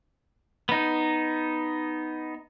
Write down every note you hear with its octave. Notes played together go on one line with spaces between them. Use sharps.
B3 D#4